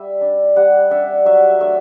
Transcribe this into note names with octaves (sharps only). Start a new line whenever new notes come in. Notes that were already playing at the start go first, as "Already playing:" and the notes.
Already playing: G3 E5
D4
G3 F#5
D4 E5
F#3 E5
A3 D4 E5